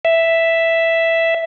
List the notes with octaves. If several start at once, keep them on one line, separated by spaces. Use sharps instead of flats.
E5